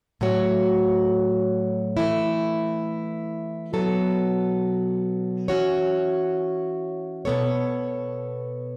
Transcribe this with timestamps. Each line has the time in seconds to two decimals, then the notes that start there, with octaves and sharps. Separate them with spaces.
0.21 A2 F#3 A3 F#4 C#5
1.97 E3 A3 E4
3.73 B2 F#3 B3 A4
5.48 E3 C#4 F#4 C#5
7.25 B2 B3 A4 C#5